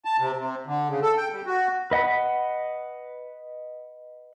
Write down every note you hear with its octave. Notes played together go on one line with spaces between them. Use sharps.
A5
C3
C3
D3
C#3
A4
G5
G3
F#4
B4 D#5 F#5 B5